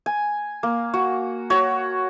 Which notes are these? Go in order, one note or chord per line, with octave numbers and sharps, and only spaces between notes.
G#5
A#3
F#4
F#4 C#5